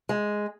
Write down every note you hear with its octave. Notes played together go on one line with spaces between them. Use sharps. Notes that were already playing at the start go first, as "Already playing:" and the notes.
G#3